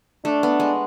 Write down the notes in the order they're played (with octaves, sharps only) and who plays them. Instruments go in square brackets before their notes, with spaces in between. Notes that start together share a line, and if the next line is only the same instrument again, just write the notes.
[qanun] A3 [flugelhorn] D4
[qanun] B3
G#3